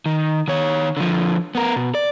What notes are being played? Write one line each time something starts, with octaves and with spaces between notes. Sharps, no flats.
D#3
D#3 C#5
D3 F3
B3 A#4
B2
D5